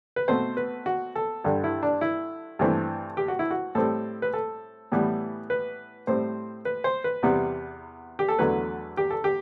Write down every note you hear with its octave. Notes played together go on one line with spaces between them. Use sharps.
B4
B2 A3 C4 C5
B4
F#4
A4
G2 D3 G3
E4
D4
E4
G2 E3 A3 C4
G4
F#4
E4
F#4
A2 G3 C4 A4
B4
A4
A2 E3 G3 B3
B4
A2 G3 C4 C5
B4
C5
B4
E2 C3 G3 B3
G4
A4
E2 D3 F#3 A3 B4
G4
A4
G4